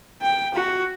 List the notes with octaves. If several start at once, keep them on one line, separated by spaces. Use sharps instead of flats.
G5
F#4